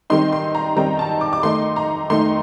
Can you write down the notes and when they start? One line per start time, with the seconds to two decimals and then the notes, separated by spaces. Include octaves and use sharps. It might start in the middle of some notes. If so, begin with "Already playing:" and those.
0.10 D#3 G3 C4 D#4 C6
0.32 C6
0.55 A#5
0.76 D#3 G3 C4 D#4 A#5
0.99 A5
1.21 D6
1.33 D6
1.43 D#3 A3 D#4 C6
1.76 A#5
2.10 D#3 A3 D#4 C6